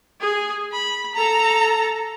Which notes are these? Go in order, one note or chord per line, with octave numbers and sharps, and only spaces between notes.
G#4
B5
A4 A#5